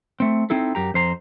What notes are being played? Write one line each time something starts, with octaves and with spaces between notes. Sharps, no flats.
A3 C4
C4 D#4 E4 A4
F#2 G4 A#5
F2 C5 A#5